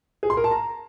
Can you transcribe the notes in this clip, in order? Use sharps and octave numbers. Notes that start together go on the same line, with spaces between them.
G#4
C6
A#4
A5
A#5